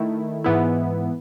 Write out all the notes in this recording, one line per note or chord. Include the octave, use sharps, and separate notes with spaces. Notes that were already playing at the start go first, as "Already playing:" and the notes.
Already playing: D#3 A3 E4
G#2 E3 B3 E4